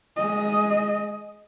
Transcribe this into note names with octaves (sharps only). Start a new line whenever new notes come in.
G#3 D#5